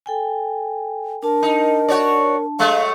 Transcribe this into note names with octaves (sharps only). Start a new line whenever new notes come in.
A4 G5 G#5
D4 A#4 A5
D#4
F#4 C#5 D5
F#3 G#3 A3 F5